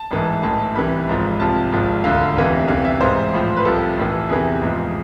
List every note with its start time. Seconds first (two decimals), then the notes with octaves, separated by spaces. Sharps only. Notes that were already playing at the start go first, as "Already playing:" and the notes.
Already playing: A5
0.11 A1 G#2 E3
0.43 B1 A2 E3 A5
0.75 C2 C3 E3 B5
1.07 G#1 G#2 F3
1.40 C2 C3 F3 A5
1.72 G#1 G#2 F3
2.04 E1 D2 D3 F5
2.36 F1 E2 C3 E3
2.68 C2 C3 E3 F5
2.85 E5
3.00 A1 G#2 E3 C5
3.33 A1 A2 F3
3.57 B4
3.65 C2 C3 F3 A4
3.97 A1 A2 E3
4.29 E2 C3 E3 G#4
4.61 A1 G#2 F3